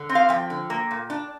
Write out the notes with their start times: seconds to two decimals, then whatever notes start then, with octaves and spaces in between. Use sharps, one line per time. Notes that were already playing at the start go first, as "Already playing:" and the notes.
Already playing: D3
0.09 C4
0.15 F5
0.29 F3 G5
0.50 D3
0.70 A#3
0.91 A#2
1.10 D4